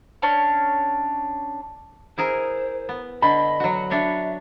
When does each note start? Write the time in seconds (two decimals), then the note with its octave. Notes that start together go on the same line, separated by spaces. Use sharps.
0.22 C#4 D4 C#5
2.18 E4 G#4 A#4 C5
2.89 B3
3.22 D3 D#5 B5
3.60 F#3 F#4
3.91 D4 C#5 E5